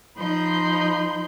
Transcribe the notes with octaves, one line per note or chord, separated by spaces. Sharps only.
F3 D#4 B5 C6 G6